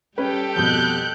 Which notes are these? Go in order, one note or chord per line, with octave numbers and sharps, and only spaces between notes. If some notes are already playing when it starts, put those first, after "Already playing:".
G3 C#4 G4 A4 B4 G5
F2 B2 F#6 G6